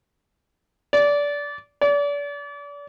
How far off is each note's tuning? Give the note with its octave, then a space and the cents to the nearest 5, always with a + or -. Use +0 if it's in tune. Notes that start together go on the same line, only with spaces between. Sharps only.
D5 -20
D5 -35